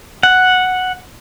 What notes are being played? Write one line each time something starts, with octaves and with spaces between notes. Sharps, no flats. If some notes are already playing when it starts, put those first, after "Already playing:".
F#5